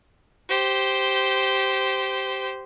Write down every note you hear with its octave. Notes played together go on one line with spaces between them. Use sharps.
G4 C5